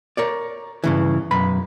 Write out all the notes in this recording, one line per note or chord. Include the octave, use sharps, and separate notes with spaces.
A#4 C#5 D5
G2 C#3 E3
B1 F#2 B4 B5